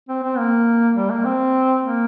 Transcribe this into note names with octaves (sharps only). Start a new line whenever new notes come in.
C4
C4
A#3
G3
A#3
C4
A#3